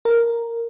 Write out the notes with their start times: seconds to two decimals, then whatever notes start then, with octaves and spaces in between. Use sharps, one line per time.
0.05 A#4